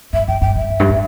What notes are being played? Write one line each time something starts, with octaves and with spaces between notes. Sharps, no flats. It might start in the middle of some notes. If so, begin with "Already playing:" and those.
G2 E5
G2 G5
G2 G5
G2 E5
E2
G2
A2